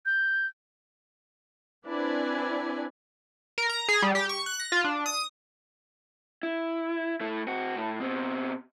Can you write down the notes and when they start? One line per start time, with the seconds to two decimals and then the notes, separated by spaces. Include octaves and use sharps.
0.06 G6
1.87 C4 D4 E4 B4 D5 G#5
3.58 A#4
3.69 A#5
3.88 G#4
4.02 G3
4.15 G4
4.29 C#6
4.46 F#6
4.60 A#6
4.72 F4
4.84 D4
5.06 D#6
6.43 E4
7.21 A3 E4
7.47 C4 F#4
7.76 A2 E4
8.00 B2 C4